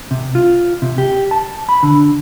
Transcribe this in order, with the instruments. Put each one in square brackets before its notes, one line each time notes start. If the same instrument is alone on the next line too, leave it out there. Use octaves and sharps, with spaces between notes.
[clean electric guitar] C3
F4
C3
G4
A5
B5
D3